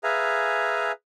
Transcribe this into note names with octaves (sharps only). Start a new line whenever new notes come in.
G#4 B4 E5 F5 G#5 A#5